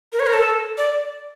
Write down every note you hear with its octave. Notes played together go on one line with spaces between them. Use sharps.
A#4
C#5
A#4
A4
D5